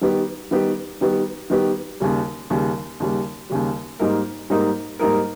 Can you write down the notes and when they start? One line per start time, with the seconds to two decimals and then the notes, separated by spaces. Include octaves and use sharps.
0.02 D#3 G3 B3 G4
0.51 D#3 G3 B3 G4
1.01 D#3 G3 B3 G4
1.50 D#3 G3 B3 G4
2.00 D#2 C#3 G3
2.50 D#2 C#3 G3
3.00 D#2 C#3 G3
3.50 D#2 C#3 G3
4.00 G#2 G3 A#3 D#4 A#4
4.50 G#2 G3 A#3 D#4 A#4
4.99 G#2 G3 A#3 D#4 A#4